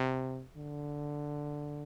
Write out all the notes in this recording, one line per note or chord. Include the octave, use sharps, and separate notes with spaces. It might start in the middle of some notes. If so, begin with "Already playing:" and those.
Already playing: C3
D3